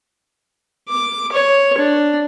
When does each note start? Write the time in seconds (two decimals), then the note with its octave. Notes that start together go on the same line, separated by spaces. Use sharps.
0.89 D6
1.32 C#5
1.78 D4